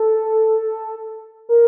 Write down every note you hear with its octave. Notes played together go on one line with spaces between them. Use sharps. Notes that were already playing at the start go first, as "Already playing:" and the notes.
Already playing: A4
A#4